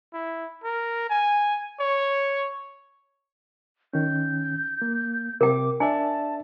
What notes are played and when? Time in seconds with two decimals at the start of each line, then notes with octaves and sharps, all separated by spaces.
0.13 E4
0.64 A#4
1.10 G#5
1.80 C#5
3.93 D#3 C#4 G6
4.82 A#3
5.41 C3 A#4 G5 D6
5.80 D4 D5 E5 G#5 A5